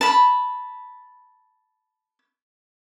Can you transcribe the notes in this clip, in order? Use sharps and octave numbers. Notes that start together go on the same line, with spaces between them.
A5 B5